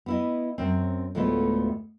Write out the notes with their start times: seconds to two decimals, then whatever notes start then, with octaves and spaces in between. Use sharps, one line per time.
0.06 B3 E4 D#5
0.58 F#2 C4 C#4
1.15 D2 A2 G#3 A3 B3 F4